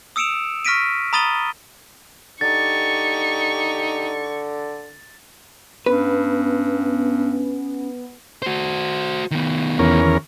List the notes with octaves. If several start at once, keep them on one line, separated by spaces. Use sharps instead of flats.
D#6 E6 C#7 D7 E7 F7
C#6 F6 A#6 B6 D7 D#7
A#5 B5 D#6 A6 D#7 G7
D3 D#4 G4 C#6 A6
G2 B3 C#4 B4
F#4 C5
D#3 B3
E2 C#4 A#4